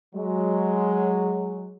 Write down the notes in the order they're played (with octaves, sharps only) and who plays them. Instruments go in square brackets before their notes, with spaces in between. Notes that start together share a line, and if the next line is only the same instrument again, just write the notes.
[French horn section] F#3 [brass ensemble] G#3